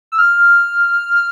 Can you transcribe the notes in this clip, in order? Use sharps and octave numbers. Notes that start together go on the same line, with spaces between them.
E6
F6